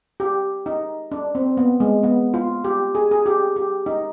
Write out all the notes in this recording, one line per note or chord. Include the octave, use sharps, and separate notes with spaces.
G4
D#4
D4
C4
B3
G#3
B3
F4
G4
G#4
G#4
G4
G4
D#4